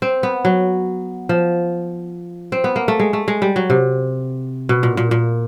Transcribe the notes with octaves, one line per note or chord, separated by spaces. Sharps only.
C4
B3
F#3
F3
C4
B3
A#3
A3
G#3
A3
G#3
G3
F#3
C3
B2
A#2
A#2
A#2